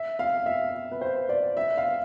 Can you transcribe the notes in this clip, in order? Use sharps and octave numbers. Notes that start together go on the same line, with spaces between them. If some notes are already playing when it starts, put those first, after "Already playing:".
Already playing: E5
F5
E5
B4
C5
D5
E5
F5